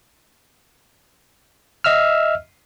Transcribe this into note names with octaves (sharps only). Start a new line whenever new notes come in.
D#5 E5 E6 F6